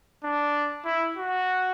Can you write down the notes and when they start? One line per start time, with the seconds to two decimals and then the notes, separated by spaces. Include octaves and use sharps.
0.24 D4
0.85 E4
1.17 F#4